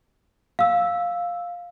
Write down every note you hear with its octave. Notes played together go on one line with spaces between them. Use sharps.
F5 E6